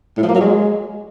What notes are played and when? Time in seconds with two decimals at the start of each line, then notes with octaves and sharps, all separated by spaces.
0.17 A2
0.23 F3
0.29 A#3
0.35 F#3
0.41 G#3